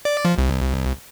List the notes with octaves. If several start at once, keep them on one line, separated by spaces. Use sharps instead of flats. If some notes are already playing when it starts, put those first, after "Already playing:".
D5
F3
C2